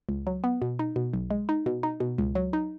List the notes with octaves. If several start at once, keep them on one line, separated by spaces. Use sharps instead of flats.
C#2
F#3
B3
B2
D#4
B2
B1
G#3
D#4
B2
D#4
B2
C#2
F#3
D#4